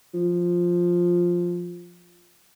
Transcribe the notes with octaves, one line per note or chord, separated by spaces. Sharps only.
F3